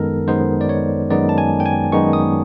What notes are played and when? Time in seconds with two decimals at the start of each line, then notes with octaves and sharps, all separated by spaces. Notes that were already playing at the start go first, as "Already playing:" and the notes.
Already playing: F#2 D#3 G#3 B3 D#4 A4 A#4
0.27 F#2 D#3 G#3 B3 D#4 C5
0.61 D5
0.69 C#5
1.10 F#2 D#3 G#3 B3 D#4 D5
1.29 A5
1.38 G#5
1.60 G5
1.66 G#5
1.92 F#2 D#3 G#3 B3 D#4 C#6
2.13 D#6